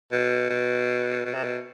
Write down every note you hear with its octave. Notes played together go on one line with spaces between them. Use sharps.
B2
B2
B2
C3
B2